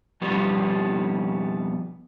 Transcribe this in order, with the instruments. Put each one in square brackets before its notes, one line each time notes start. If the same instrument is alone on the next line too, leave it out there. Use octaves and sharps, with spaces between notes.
[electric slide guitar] F2 B2 G3 B3